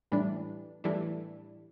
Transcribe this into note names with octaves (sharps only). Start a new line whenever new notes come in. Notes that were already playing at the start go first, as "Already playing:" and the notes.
A2 E3 G3 D4
A2 E3 G3 D4